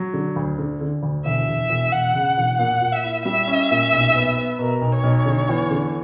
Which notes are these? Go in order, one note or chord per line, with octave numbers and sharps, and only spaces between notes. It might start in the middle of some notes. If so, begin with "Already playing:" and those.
Already playing: F#3
D3
D2
D3
D3
D2
E1 E5
E1
E1
E1 F#5
C#3
E1
A#2 F#5
A#2
E5
E4
G3 E5
C#4
A#2
B1
B3
B3
B2 A#4
B1
C#5
B1
D3
E2
D3